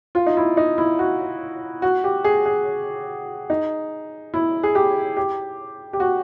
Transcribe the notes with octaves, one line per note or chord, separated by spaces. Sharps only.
F4
D#4
E4
D#4
E4
F#4
F#4
G4
G#4
G#4
D#4
E4
G#4
G4
G4
G4
F#4